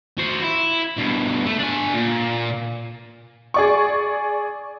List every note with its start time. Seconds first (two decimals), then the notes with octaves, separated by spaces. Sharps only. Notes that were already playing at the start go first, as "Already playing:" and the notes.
0.18 F#4 C5
0.42 E4
0.97 G2 B2
1.46 A3
1.59 D4 G#5
1.94 A#2
3.54 G#4 D5 C#6